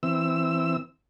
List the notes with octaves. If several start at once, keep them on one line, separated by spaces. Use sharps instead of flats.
E3 C4 E6